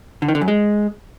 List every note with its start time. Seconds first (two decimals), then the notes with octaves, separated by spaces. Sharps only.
0.22 D3
0.28 D#3
0.35 D3
0.41 F#2
0.48 G#3